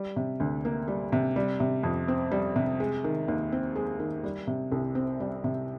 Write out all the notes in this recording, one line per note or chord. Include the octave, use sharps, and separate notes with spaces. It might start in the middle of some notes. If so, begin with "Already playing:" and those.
Already playing: G3
C3
D2
A#3
G3
C3
G3
C3
F2
C4
G3
C3
G#3
D#3
D#2
C4
G#3
D#3
G3
C3
C2
C4
G3
C3